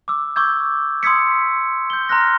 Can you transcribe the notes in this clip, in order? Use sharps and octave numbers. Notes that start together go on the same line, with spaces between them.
D6 E6
C#6 D6 E6 G6 G#6
C6 D#6 E6 G#6 B6 C#7
G6 G7
A#5 C6 F6 F#6 A#6